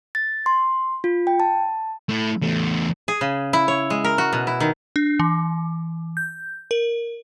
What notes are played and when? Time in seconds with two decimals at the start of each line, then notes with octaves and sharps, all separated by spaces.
0.15 A6
0.46 C6
1.04 F4
1.27 G5
1.40 A5
2.09 A3 E4
2.42 E2 A3
3.08 G#4
3.21 C#3
3.53 E4
3.68 C#5
3.90 G#3
4.04 A#4
4.18 F#4
4.33 B2
4.47 E4
4.60 D#3
4.96 D4
5.20 E3
6.17 G6
6.71 A#4